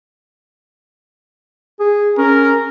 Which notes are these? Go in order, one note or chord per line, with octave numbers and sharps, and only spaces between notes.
G#4
C#4 A#4